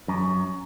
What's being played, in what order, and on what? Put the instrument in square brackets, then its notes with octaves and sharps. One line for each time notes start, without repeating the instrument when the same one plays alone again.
[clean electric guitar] F#2